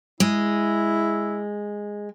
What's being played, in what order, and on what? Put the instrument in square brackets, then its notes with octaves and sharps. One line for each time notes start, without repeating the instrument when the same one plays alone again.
[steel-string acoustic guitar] G#3 [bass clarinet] E4